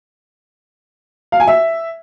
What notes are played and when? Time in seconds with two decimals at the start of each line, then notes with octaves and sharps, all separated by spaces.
1.32 F5
1.40 G#5
1.47 E5